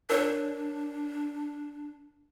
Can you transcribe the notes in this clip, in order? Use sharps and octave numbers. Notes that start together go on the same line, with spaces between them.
D4 A#4 C#5 D5